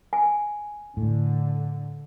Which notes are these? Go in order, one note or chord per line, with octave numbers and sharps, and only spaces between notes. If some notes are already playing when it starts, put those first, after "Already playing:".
G#5
A2 D3